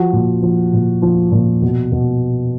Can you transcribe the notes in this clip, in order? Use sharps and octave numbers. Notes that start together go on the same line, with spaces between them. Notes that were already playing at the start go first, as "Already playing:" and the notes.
Already playing: F3 F#4
A#2
F3
A#2
F3
A#2
B2
B2